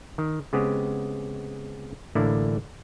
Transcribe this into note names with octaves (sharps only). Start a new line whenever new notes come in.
D#3
C#3 G#3 B3 C4 G4
A1 A2 D3 A#3 D4 E4